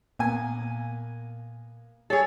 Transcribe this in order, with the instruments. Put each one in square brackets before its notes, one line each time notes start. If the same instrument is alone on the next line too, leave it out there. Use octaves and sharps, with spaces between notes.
[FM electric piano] A#2 [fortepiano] A#3 B3 G#5
[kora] G#4 A4 [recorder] C#5